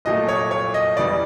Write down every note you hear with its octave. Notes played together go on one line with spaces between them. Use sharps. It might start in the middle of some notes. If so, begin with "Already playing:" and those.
C2 A#2 F#3 A3 D#5
C#5
C#5
D#5
E2 C#3 E3 G3 D5